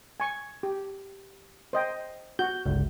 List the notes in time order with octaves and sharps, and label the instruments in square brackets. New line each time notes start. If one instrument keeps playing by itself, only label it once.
[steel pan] G#5 C#6
G4
C5 D#5 G5
[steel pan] F#4 [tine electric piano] G6
[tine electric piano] G1 C#2